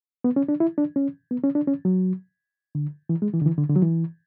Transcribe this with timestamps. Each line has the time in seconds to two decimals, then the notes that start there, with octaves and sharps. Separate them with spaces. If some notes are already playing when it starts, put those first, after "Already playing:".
0.24 B3
0.36 C#4
0.49 D4
0.60 E4
0.78 D4
0.96 C#4
1.31 B3
1.44 C#4
1.55 D4
1.67 C#4
1.85 F#3
2.75 D3
3.09 E3
3.22 G#3
3.34 E3
3.42 D3
3.46 E3
3.58 D3
3.69 D3
3.76 F#3
3.82 E3